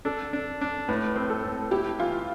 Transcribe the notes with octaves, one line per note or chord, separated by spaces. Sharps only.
D4 A4
D4
D4
A2 B4
C4
A4
A2
E4 G4
E3 F4